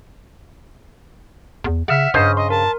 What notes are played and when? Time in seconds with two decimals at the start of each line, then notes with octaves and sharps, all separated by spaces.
1.64 E2
1.88 C#3 E5 F#5 F6 B6
2.14 G2 C#3 C5 D#5
2.37 D#5 C6
2.50 A#4 A5